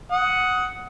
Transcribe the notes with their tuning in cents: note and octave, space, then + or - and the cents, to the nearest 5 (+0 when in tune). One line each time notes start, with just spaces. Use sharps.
F#5 +0 D#6 +15